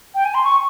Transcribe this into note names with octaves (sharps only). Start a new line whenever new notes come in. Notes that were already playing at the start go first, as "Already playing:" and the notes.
G5
G#5
C6
C#6